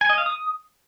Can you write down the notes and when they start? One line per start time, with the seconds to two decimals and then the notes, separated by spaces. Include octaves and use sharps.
0.01 G#5
0.09 D#5
0.18 F5
0.26 D#6